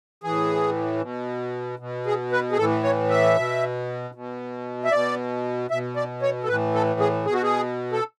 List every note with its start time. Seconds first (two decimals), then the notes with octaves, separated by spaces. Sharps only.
0.23 A2 E3 G#4
1.01 B2
1.79 B2
2.06 G#4
2.32 B4
2.52 G#4
2.57 A2 E3 A4
2.83 C#5
3.10 E5
3.36 B2
4.15 B2
4.84 E5
4.91 B2 D5
5.71 B2 E5
5.96 D5
6.22 C#5
6.44 A4
6.48 A2 E3 B4
6.75 A4
7.00 G#4
7.26 B2 G#4
7.34 F#4
7.43 G#4
7.92 A4